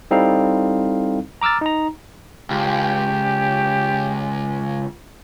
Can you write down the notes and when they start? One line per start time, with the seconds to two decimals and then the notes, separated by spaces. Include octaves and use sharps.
0.11 G3 C4 D#4 E4 A4 F5
1.41 A#5 D6 E6 F6 A6
1.61 D#4 A#5
2.51 C#2 G4